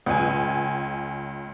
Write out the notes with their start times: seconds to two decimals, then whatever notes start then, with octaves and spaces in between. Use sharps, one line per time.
0.06 C#2 G#5